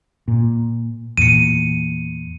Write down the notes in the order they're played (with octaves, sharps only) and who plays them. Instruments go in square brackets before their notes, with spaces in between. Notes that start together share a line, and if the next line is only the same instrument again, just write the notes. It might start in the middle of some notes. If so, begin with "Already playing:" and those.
[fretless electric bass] A#2
[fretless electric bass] E2 A#2 [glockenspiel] C#7 D#7